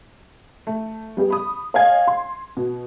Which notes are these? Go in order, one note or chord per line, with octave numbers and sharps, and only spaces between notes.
A3
G3 B3 G4 G#4
B5 D#6
C#5 D#5 F5 G#5 G#6
C6
B2